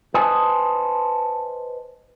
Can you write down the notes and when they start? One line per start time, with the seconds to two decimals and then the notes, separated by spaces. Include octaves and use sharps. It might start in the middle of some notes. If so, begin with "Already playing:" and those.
0.14 B4 C5 D#5 G#5 A5